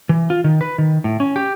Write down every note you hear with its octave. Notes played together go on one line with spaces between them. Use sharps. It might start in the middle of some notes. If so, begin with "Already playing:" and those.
E3
F4
D#3
B4
D#3
A2
C#4
G4